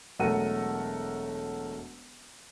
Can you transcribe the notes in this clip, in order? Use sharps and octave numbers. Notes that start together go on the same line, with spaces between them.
E1 F#3 A3 A#4 F#5 D#7